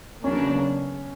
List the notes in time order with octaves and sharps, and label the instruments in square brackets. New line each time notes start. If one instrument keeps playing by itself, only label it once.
[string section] E2 C#3 F#3 A#3 D4 [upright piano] C#4